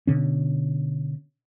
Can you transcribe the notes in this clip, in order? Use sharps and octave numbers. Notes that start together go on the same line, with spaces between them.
B2 D3 C#4